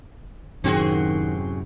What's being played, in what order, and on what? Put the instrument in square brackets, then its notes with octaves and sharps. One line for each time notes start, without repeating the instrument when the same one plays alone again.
[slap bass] F#2 A2 C3 [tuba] D#3 [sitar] C4 F#4 G#4